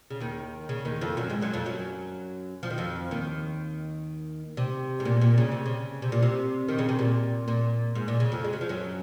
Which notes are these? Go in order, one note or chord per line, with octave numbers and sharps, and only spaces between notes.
C#3
D#2 D#3
C#3
D#2 D#3
F2 F3
F#2 F#3
G#2 G#3
F#2 F#3
F2 F3
F#2 F#3
F3
D#3
F2 F3
D#2 D#3
C3
G#2
A#2
A#2
C#3
C3
C#3
C3
A#2
C3
D#3
C#3
C3
A#2
A#2
G#2
A#2
C#3
F2 F3
G#3
F#3
F3
F#2 F#3